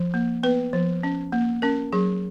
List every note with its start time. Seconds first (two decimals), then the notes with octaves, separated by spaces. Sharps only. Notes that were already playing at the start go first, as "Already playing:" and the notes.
Already playing: F3
0.14 A#3
0.43 B3 B4
0.73 F3
1.03 C#4
1.32 A#3
1.62 C#4 A#4
1.93 F#3 G#4